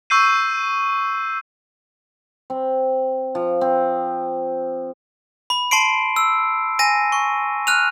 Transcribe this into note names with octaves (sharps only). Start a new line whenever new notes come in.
C#6 E6 G6 C7 D#7
C4
F3
C4
B5
A5 C6 C7 D7
E6
G#5 A#6 D#7
C#6
F6 F#6 D#7 F7